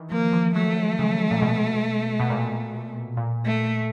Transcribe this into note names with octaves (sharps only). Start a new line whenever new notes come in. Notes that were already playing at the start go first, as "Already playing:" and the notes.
Already playing: D#3 E3
F3 A#3
F3
F#3 A3
C#3
A#2
B2
B2
A#2
A#2
A3